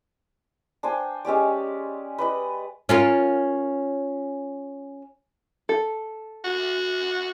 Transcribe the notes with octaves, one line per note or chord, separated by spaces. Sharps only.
D4 C5 G5 G#5
G#3 C#4 G4 D5
B4 D5 D#5
C#4 F4 A#4
A4
F#4